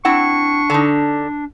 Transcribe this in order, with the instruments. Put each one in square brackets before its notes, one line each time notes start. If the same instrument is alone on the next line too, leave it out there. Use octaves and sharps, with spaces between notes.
[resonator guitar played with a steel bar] C4 E4 F#5 [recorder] D4 [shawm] C#6
[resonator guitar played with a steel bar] D3 D#4